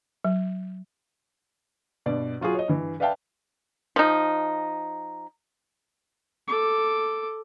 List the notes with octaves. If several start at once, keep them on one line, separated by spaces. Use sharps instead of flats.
F#3
G2 B2 D5
F#3 F4 F#4 G#4
C#5 D#5
G2 E3
B4 D5 E5 F5 G5 A5
F3 D#4
A4 D6